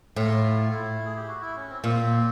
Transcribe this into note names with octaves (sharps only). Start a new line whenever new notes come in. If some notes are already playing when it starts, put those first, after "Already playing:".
A2 F4
E4
G#4
G4
F#4
E4
C#4
C4
A#2 C4